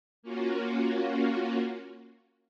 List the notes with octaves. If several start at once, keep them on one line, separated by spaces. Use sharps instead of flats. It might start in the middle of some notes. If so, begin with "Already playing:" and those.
A#3 C#4 F4 F#4